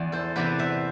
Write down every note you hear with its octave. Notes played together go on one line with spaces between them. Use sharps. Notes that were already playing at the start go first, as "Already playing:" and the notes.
Already playing: E2 D5
A4 C5
C3 E3 B3 B4 D5
C5 E5